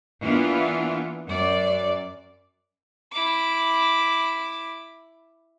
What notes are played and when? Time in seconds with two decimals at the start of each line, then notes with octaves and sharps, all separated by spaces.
0.22 E3 A#3 B3 D4 F4
1.26 F#2 D5
3.12 E4 D6